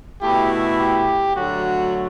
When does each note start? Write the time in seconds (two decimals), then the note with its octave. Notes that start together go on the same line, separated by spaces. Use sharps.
0.21 B2 A3 E4 G4
0.78 G4
1.36 D3 F#3 A3 F#4